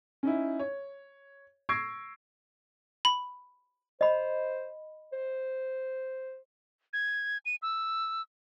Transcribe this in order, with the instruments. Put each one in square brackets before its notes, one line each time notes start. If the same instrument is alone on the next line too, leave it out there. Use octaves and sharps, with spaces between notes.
[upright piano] C#4 D#4 E4
C#5
C#6 E6 G#6 A#6 C7 D7
[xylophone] B5
[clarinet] C5 [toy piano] D#5 B5
[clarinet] C5
[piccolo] G#6
D#7
E6